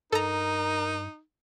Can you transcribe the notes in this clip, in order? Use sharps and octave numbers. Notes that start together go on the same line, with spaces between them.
G2 D#4 A4 A#4 A#5